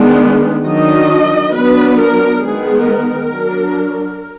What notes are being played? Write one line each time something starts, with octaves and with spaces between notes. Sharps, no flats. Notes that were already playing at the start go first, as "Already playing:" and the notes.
Already playing: D#3 G#3 B3 D4
D#3 F#3 D4 D#5
F#3 B3 D4 B4
A#4
D#3 G#3 B3 G#4
A#4
F#3 D4